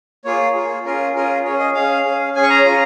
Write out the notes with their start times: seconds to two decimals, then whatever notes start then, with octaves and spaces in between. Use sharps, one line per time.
0.25 A#3 F4 G#4 C#5
0.55 A#3 F4 G#4
0.85 C#4 F4 G#4 A#4
1.15 C#4 F4 G#4 A#4
1.45 C#4 G#4 C#5
1.60 D#5
1.74 C#4 G#4 F5
2.05 C#4 G#4
2.35 C#4 G#4 G#5
2.43 C#6
2.50 A#5
2.64 C#4 F4 G#4